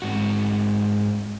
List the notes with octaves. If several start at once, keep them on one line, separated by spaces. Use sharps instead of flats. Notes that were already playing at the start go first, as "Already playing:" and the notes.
G#2 F#4